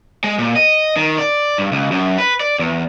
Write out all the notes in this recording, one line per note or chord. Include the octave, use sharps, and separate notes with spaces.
G#3
A#2
D#5
D#3
D5
G2
C#2
F#2
B4
D5
E2